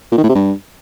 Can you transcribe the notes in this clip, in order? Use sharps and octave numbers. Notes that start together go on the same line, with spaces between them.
A#2
D#3
A2
C3
G2